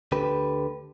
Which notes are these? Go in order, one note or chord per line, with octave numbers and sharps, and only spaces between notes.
D2 D3 G4 B4